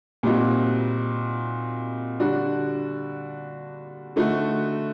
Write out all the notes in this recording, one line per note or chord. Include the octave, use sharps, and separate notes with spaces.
A#2 G3 C4 D#4 F#4
D3 G3 D4 F#4
D3 A3 D#4 F#4